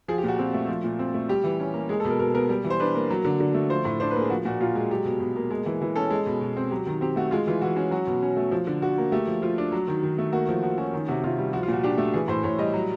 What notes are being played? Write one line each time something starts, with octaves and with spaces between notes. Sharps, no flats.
F3 G#4
G4
A#2 F#4
C4 F#4
A3
F3
A#2
C4
A3
G3 G4
E3
C#4
A#3
G#3 G#4
A4
B2 A#4
B2 A#4
B3 A#4
G3
E3
C5
D4 B4
A#3
F#3
D3
D3
A3
F3 C5
A2
D4 C5
B4
A#3 G#4
F3 F#4
A#2 F#4
A#2 F4
G#3
F#3 G4
B2
B2
A#3
G#3
E3
E3
C#4 A4
G#3
B2
B2
C4
F#3 G4
D#3
C4 G4
A3 F#4
G#3 F4
E3 F4
E3 F#4
C#4 F#4
F#3 F#4
B2
C#4
A3
F3
D3
D3 F#4
A#3
A3 G4
F3
F3 F4
D4
F#3
D#3
D#3
A3
A#3 F#4
F3
F3 F#4
C#4 F#4
D#3
C3 F#4
C3 F4
G3
F3 F#4
F4
A#2 F#4
D4 G4
A3
E3 G#4
A2 C5
A2 C#5
G3 D#5
F#3